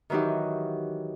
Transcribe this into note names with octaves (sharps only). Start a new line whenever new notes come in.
D#3 E3 F#3 D#4 G4